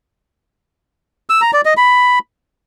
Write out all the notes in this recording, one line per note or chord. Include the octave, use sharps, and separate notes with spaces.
E6
A#5
D5
D#5
B5